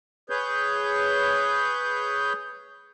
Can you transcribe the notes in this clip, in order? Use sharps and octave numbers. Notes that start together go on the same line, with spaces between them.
G#4 B4 C#5 G6